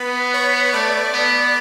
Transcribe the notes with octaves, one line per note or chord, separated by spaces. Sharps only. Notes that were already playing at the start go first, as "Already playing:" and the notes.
Already playing: B3 B4 B5
C#5 C#6
A3 D5 D6
B3